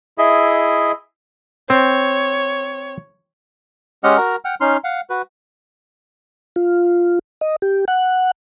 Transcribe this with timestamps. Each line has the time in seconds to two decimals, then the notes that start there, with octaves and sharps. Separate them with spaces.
0.18 E4 G#4 D#5 E5
1.70 C4 C#5
4.04 G#3 C#4 G4 D#5 F#5 F6
4.18 F#4 A#4 A#5
4.45 F#5 G5 F6
4.61 C#4 D#4 C6 F6
4.84 F5 F#5
5.10 F#4 B4
6.56 F4
7.41 D#5
7.62 G4
7.88 F#5